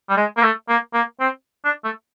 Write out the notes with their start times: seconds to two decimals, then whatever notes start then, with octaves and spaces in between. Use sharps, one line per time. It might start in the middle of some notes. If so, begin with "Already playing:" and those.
0.09 G3
0.17 G#3
0.37 A#3
0.43 A3
0.69 A#3
0.94 A#3
1.20 C4
1.65 D4
1.84 A3